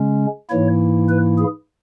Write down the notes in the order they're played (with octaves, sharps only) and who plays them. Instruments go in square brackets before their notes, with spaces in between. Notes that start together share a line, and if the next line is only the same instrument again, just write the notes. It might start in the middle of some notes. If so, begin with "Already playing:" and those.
Already playing: [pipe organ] C#3 G#3 C#4
G#2 E3 A#3 E4 C#5
B4
G#4